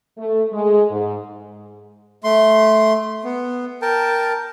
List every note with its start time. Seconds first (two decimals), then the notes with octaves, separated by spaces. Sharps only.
0.17 A3
0.52 G#3
0.90 G#2
2.24 A3 C6
3.24 B3
3.82 A#4 G5 A5